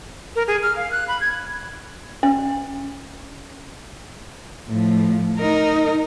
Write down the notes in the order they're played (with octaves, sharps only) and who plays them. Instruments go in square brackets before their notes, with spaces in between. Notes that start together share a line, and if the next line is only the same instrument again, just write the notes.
[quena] A#4
G#4
F6
F5
F#6
B5
G#6
[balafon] C#4
[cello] A2 F3
D#4 A#4